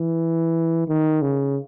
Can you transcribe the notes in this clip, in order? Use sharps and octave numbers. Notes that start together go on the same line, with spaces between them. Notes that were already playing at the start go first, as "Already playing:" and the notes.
Already playing: E3
D#3
C#3